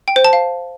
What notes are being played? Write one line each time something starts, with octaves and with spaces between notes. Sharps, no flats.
G5
C5
A5
F5